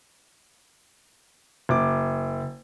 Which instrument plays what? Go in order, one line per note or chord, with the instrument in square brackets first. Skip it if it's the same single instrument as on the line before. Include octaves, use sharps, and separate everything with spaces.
[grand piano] F#1 D6